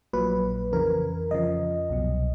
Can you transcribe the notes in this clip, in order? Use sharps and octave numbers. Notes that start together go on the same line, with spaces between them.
A#1 A#2 F#3 B4
F2 C#3 E3 A#4
F2 C#3 F3 D#5
C2 B2 F#3